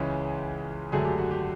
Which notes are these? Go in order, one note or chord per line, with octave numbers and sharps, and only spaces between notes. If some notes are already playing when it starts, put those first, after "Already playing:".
Already playing: C#2 C#3 E3 G#3 C#4
G#1 F#2 D3 F#3 A3 G#4
G4
F#4
G4